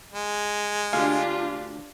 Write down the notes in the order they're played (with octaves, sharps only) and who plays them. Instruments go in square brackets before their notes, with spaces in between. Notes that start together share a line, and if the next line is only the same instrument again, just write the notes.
[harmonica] G#3
[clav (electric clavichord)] D2 F5 G#5 [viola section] D4 F4 G4